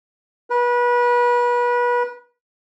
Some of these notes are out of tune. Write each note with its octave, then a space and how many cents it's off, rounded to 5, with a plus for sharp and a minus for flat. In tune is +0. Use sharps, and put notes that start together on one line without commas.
B4 -30